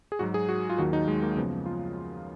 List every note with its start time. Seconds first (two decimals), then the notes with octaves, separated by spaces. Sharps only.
0.12 G#4
0.19 G#2 F#3 F#4
0.34 G#4
0.49 F#4
0.70 F4
0.78 D#2 D#3 F#3 F#4
0.93 D#4
1.08 G#3
1.22 A#3
1.37 F#2 C#3 F3 B3
1.66 F4